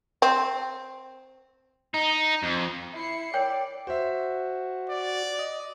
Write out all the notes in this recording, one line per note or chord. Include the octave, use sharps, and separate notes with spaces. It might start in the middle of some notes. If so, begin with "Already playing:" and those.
C4
D#4
F2
E4 C7 C#7
A#4 C#5 D5 G5
F#4 C5 E5
D5
D#5